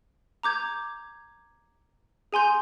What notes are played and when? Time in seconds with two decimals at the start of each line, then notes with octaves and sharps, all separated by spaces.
0.43 A#5 D6 G6 G#6
2.33 G#4 G#5 C6 G6